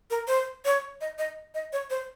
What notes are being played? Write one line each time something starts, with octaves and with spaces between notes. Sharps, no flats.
A#4
C5
C#5
D#5
D#5
D#5
C#5
C5